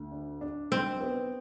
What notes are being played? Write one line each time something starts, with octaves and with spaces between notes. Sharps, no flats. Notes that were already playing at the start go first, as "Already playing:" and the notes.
Already playing: D2
D4
D4
B1 C4
B3